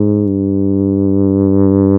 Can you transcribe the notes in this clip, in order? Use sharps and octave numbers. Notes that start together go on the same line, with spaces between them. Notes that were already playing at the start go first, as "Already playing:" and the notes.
Already playing: G#2
G2